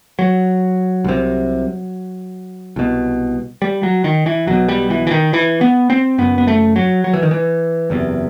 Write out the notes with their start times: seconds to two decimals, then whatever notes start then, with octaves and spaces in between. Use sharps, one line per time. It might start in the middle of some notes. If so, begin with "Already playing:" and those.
0.19 F#3
1.04 C2 C3
2.76 C2 B2
3.62 G3
3.83 F#3
4.04 D#3
4.26 E3
4.47 B1 B2 F#3
4.68 G3
4.90 E3
5.07 E3
5.11 D#3
5.33 E3
5.61 B3
5.90 C4
6.18 F#1 F#2 B3
6.38 B3
6.47 A3
6.76 F#3
7.04 F#3
7.13 E3
7.23 D#3
7.31 E3
7.90 F#1 E2 C3